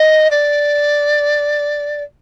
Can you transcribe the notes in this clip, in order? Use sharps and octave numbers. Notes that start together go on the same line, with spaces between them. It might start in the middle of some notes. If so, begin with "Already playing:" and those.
Already playing: D#5
D5